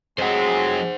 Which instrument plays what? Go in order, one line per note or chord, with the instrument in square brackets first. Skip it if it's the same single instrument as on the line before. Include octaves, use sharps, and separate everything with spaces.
[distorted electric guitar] F2 C4 [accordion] F#3 G#3 [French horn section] G#4 [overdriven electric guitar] C5 F#5